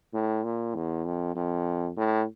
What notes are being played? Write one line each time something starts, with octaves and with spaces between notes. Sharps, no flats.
A2
A#2
E2
F2
F2
A2